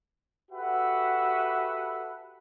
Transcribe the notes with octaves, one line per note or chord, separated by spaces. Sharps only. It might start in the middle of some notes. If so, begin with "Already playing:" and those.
F#4 G4 A4 B4 E5 F#5